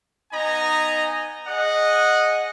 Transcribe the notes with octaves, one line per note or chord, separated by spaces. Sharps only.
B3 D#4 D#5 G#5 A#5
G#4 D#5 F#5